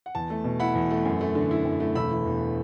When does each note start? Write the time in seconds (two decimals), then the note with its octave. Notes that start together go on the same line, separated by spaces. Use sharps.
0.06 F#5
0.15 E2 A5
0.30 A3
0.44 B2
0.60 E4 F#5 B5
0.75 E2
0.90 A3
1.05 F#2
1.21 A3
1.35 D3
1.51 E4
1.65 F#2
1.80 A3
1.95 E1 B5 E6
2.11 E3
2.25 E2